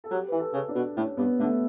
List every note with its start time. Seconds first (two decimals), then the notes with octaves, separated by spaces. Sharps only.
0.04 A4
0.11 F#3 G4
0.28 E3 B4
0.39 A4
0.53 C#3
0.68 D4
0.75 B2
0.96 A2 C#4
1.17 G2 B3
1.39 D3 A3